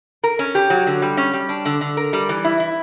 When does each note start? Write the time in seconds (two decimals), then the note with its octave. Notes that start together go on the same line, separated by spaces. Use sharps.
0.24 A#4
0.39 C#4
0.55 G4
0.70 F#3
0.87 D3
1.02 G3
1.17 C#4
1.34 G3
1.49 D4
1.65 D3
1.81 D3
1.97 A#4
2.13 G3
2.29 E3
2.44 E4
2.60 E4